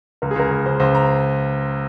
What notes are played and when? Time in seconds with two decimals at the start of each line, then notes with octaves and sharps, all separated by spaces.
0.22 C#2 A#4
0.31 G#4
0.36 C#2 A#4
0.51 C#2
0.66 C#2 C5
0.80 C#2 C5
0.95 A#5